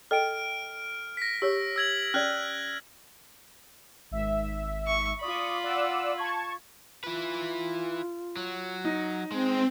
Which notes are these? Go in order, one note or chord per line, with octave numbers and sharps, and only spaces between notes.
A4 D#5 G5 F6 D7
A#6 B6
G4 C#5 E6
E6 G#6 F#7
C#4 D5 F6 F#6 G#6
G#1 E5
C#6
F4 D5 B5 C#6 D#6
D5 F#5 E6
A5 C#6 G#6
E4 F4 B4
F#3
D#4
G#3 C4